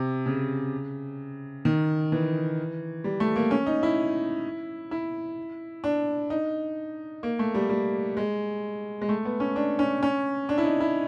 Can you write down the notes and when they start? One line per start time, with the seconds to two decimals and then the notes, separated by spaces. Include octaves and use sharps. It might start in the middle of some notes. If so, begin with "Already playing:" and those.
Already playing: C3
0.26 C#3
1.65 D#3
2.12 E3
3.04 G3
3.20 A3
3.36 A#3
3.51 C#4
3.66 D#4
3.83 E4
4.91 E4
5.84 D4
6.30 D#4
7.23 A#3
7.39 A3
7.54 G3
7.69 G3
8.17 G#3
9.02 G#3
9.09 A3
9.25 B3
9.40 C#4
9.56 D4
9.79 C#4
10.03 C#4
10.49 D4
10.58 E4
10.65 D#4
10.80 E4